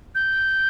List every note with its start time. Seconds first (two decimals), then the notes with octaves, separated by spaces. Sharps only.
0.15 G6